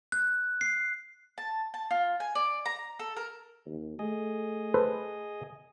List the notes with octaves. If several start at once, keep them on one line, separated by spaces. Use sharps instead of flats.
F#6
C7
A5
A5
F4
G#5
D5
A#5
A4
A#4
D#2
A3 G#4 D#5
A4 B4 C5